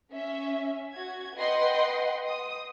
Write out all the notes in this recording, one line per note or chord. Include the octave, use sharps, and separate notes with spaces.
C#4 E5
F#4 G#6
B4 D#5 F#5 G5 C6
D#6